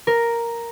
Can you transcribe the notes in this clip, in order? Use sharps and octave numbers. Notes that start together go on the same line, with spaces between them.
A#4